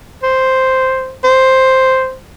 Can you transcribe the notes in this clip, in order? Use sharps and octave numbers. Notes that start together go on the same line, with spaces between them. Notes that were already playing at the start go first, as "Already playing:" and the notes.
C5
C5